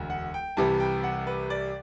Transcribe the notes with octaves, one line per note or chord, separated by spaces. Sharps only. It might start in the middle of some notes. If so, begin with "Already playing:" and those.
Already playing: E1 D2 D3
F#5
G5
C2 C3 E3 G3 A5
G5
F#5
B4
D5